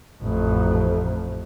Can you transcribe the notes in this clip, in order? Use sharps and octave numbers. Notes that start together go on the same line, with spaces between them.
A1 F2